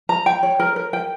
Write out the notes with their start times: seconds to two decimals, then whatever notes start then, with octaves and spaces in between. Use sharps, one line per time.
0.09 A#5
0.26 G5
0.43 C#5
0.60 A#4
0.76 A#4
0.93 G5